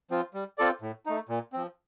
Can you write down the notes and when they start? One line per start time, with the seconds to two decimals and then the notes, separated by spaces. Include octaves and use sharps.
0.11 F3 C4 F4
0.34 G3
0.58 C4 F4 A4 D5
0.82 A2
1.06 A3 D#4
1.29 A#2
1.53 F3 C4